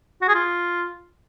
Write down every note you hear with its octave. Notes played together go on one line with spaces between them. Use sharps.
F#4
G#4
F4